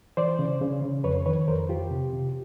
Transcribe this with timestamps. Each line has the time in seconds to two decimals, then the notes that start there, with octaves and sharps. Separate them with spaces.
0.17 E3 C5 D5
0.39 C#3
0.61 C#3
0.82 C#3
1.04 F2 B4 C#5
1.26 D#3 B4 C#5
1.48 F2 A#4 C5
1.69 F2 F4 G4
1.91 C3
2.13 C3